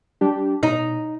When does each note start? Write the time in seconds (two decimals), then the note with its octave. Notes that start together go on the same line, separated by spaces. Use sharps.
0.21 G3 D4 G4
0.63 B2 D#4